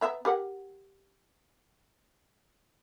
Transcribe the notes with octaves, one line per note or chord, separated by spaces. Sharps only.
B3 E5 A#5
G4 A#4 F#5